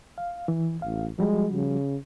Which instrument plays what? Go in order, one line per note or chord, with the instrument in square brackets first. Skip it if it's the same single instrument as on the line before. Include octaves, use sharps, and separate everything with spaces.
[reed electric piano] F5
E3
[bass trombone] A1 [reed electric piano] F5
[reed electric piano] F3 G3 F#4 [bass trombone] G#3
[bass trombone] C#3